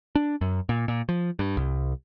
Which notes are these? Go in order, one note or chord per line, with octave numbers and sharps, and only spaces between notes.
D4
F#2
A#2
A#2
F3
G2
C2